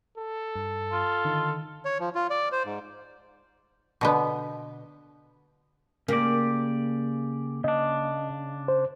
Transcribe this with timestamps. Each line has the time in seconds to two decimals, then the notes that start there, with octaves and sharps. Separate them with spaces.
0.18 A4
0.56 G2
0.92 F4
1.25 D3 D#3 D#4
1.85 C#5
1.99 F3
2.15 F4
2.30 D5
2.52 C5
2.65 G#2
4.01 B2 D3 B3
6.08 C#3 A#3 G4 D5
7.64 C#3 D4 D#5
8.68 C5